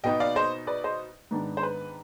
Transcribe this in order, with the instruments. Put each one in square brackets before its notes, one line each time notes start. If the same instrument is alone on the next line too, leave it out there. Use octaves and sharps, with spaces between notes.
[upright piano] B2 B3 D#4 D#5 G5
D5 F5
C5 D#5
B4 D5
C5 D#5
G#2 D#3 B3 D4
C5
B4